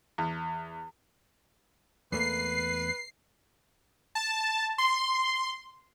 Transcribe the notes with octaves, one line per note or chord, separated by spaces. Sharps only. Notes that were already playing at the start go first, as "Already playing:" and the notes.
E2
E2 A3 A#3 B4 C7
A5
C6